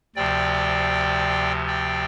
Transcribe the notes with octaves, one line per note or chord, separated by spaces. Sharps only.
D2 C3 F3 D5 G5
D5 G5